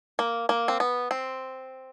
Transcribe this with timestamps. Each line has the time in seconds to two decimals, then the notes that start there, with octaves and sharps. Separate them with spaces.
0.19 A#3
0.49 A#3
0.68 C4
0.80 B3
1.11 C4